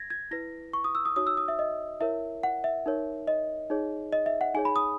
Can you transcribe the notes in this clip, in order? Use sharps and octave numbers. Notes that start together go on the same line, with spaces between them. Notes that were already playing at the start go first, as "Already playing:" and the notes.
Already playing: G#6 A#6
G#6
E4 B4 A#6
C#6
D#6
E6
D#6
D#4 F#4 C#5 D#6
E6
D#6
E5
D#5
E4 A#4 C#5 E5
F#5
E5
D#4 A#4 C#5
D#5
D#4 G#4 C#5
D#5
E5
F#5
D#4 G#4 C#5 G#5
B5
D#6